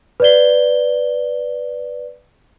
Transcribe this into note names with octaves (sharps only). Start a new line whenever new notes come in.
B4 D5 G7